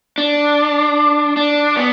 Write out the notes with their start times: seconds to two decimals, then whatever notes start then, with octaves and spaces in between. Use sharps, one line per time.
0.18 D4
1.37 D4
1.77 B3